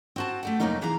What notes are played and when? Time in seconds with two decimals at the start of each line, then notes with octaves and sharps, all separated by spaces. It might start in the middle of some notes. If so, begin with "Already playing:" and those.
0.16 C4 F#4 A5
0.43 A3 G4 F#5
0.60 F2 C3 F#3 A#3 C#4 D#4
0.81 C3 E3 G#4 F5 A#5